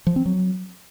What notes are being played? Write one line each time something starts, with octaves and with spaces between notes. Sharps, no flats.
F3
C4
F#3